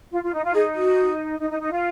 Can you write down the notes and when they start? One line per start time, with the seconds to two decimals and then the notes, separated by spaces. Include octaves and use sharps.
0.12 F4
0.23 F4
0.33 D#4
0.44 F4
0.54 D#4 G#4
0.75 F#4
1.40 D#4
1.50 D#4
1.61 D#4
1.71 F4